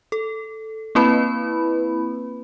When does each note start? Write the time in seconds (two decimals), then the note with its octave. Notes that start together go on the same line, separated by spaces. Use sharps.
0.12 A4
0.95 A#3 C4 E4 B4 B5